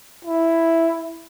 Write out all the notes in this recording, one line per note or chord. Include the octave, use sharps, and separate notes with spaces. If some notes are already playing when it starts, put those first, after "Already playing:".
E4